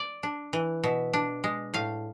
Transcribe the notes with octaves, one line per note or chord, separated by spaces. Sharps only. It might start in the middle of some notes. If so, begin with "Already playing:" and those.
Already playing: D5
D4
E3
B2 E5
D4
G#3
A2 F5